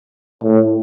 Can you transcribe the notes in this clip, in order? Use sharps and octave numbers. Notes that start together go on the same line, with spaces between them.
A2